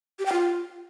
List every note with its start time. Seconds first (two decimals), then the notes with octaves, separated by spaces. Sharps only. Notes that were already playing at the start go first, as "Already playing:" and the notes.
0.19 G4
0.26 G5
0.32 F4